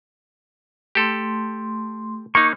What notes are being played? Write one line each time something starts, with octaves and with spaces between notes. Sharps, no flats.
A3 G4 A4 C6
A#3 D#4 C#6